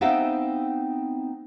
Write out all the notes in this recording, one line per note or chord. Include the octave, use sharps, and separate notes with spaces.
B3 C4 D#4 E5 F5 G5